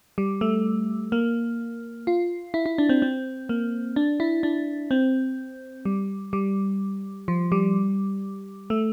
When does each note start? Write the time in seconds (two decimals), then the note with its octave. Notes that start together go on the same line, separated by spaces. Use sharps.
0.18 G3
0.41 A3
1.12 A#3
2.07 F4
2.54 E4
2.66 E4
2.78 D4
2.89 C4
3.02 C4
3.49 A#3
3.96 D4
4.20 E4
4.43 D4
4.91 C4
5.85 G3
6.33 G3
7.28 F3
7.52 G3
8.70 A3